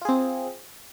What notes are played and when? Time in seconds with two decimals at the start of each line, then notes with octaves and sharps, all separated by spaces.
0.02 F4
0.05 G#4
0.09 C4